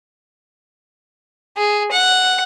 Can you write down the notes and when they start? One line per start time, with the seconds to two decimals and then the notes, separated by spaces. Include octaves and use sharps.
1.58 G#4
1.91 F#5